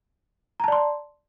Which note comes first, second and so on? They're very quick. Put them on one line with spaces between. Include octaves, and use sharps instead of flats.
A#5 A5 D5 C6